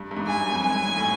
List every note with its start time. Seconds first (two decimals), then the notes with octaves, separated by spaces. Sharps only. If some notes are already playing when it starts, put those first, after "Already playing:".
Already playing: G2
0.11 G2
0.17 G#2
0.28 G2 G#5
0.40 F#2
0.51 F2
0.63 F#2 G#5
0.74 G2
0.86 G#2
0.97 A2